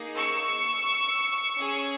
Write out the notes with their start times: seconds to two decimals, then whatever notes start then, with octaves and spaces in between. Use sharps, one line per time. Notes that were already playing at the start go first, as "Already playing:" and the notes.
Already playing: A#3 D#4 G#4
0.17 C#6 E6
1.57 C#4 G#4